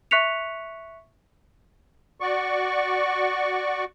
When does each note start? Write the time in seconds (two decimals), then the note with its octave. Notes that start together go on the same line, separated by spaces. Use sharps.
0.11 E5 C#6 F#6 B6 C#7 F7
2.20 F#4 D5 C#6